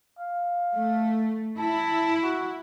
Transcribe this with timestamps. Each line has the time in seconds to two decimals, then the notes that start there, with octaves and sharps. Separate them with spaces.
0.19 F5
0.75 A3
1.59 E4 A5
2.23 F#4